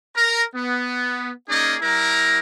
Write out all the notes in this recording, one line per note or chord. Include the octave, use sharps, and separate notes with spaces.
A#4 A#5
B3
A#3 C#4 D#4 G#4 D5 D#5
G3 E4 A#4 A#5